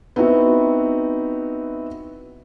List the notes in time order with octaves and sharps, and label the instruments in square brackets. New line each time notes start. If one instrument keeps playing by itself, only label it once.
[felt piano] B3 C4 D#4 E4 F#4